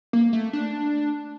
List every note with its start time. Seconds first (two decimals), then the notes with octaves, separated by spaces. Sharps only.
0.13 A#3
0.33 A3
0.53 D4